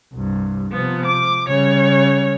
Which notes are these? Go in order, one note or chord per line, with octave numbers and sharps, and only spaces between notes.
C2 G2
C3 F3 B3
D6
C#3 G3 C#5